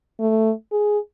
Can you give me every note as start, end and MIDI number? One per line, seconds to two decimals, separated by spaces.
0.20 0.52 57
0.72 0.98 68